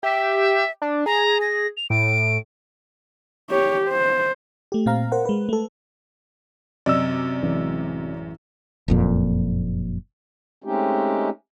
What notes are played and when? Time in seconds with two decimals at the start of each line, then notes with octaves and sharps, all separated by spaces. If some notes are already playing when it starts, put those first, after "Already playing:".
0.03 G4 E5
0.82 D4
1.06 G#4 A#5
1.41 A#6
1.77 F7
1.90 A2 D7
3.50 G4 C#5
3.89 C5
4.72 A3 G4
4.86 A#2 C4 F5 A#5
5.12 A#4 C5 F#5
5.25 G#3 B4
5.49 A3 A4
6.86 F#2 C3 D5 D#5 E6
7.42 A1 G#3
8.88 F#1 F2 A#2
10.64 G#3 A3 C4 C#4 D#4 G4